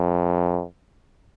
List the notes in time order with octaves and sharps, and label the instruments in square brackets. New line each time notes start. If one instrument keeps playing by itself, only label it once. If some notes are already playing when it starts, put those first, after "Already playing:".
Already playing: [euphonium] F2